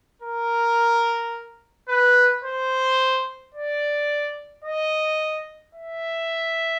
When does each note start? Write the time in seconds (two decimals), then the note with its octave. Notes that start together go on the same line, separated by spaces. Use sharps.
0.22 A#4
1.89 B4
2.44 C5
3.54 D5
4.65 D#5
5.75 E5